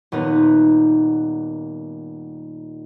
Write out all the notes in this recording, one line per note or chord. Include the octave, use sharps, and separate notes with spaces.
D#1 B3 D#4